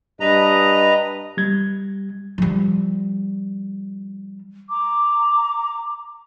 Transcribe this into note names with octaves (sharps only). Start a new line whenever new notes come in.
G2 B4 D#5 A#5
G3 G#6
F3 G3
A#5 D6